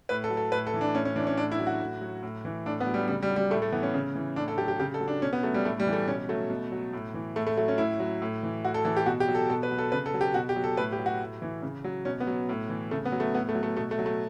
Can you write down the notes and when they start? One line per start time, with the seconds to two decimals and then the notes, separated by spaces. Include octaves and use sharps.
0.09 A2 B4
0.24 A4
0.30 F#3
0.37 A4
0.52 A2 B4
0.67 A4
0.74 E3
0.81 D4
0.95 A2 C#4
1.05 C#4
1.16 E3 D4
1.27 C#4
1.37 A2 D4
1.52 E4
1.59 F#3
1.67 F#4
1.80 A2
2.01 F#3
2.23 A2
2.45 E3
2.66 A2 D4
2.80 B3
2.87 F#3
2.94 G3
3.08 C#3 G3
3.23 G3
3.30 F#3
3.36 G3
3.51 A2 A3
3.62 A3
3.72 E3 B3
3.83 C#4
3.94 C#3
4.16 E3
4.36 A2 D4
4.48 A4
4.57 F#3 G4
4.68 G4
4.80 C#3 G4
4.94 A4
5.00 F#3
5.08 D4
5.22 B2 C#4
5.33 B3
5.43 F#3 A3
5.54 G3
5.64 A2 A3
5.80 G3
5.87 E3
5.93 A3
6.07 B2 C#4
6.29 F#3 A3
6.50 B2
6.72 F#3
6.93 A2
7.14 E3
7.36 A2 A3
7.47 A3
7.57 F#3 A3
7.68 C#4
7.78 A2 E4
8.00 F#3
8.22 A2
8.43 E3
8.65 A2 F#4
8.74 A4
8.85 E3 A4
8.97 G4
9.06 B2 F#4
9.20 G4
9.28 F#3
9.35 A4
9.49 B2 A4
9.63 B4
9.71 F#3
9.78 A4
9.92 C#3 B4
10.06 A4
10.14 F#3
10.21 G4
10.34 B2 F#4
10.49 G4
10.56 F#3
10.64 A4
10.77 A2 B4
10.92 G4
10.99 F#3
11.06 F#4
11.20 A2
11.42 E3
11.63 C#3
11.84 F#3
12.05 B2 C#4
12.21 B3
12.27 F#3
12.49 A2
12.70 E3
12.91 C#3 A3
13.05 B3
13.12 F#3
13.20 A3
13.34 A2 B3
13.49 A3
13.55 F#3
13.63 A3
13.76 B2 A3
13.91 A3
13.99 F#3
14.06 A3